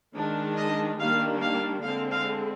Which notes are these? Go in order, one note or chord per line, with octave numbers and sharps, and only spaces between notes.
D#3 G#3 D4
D#5
D#3 G3 A#3 D4 F5
F5
D3 G#3 C4 F5
F5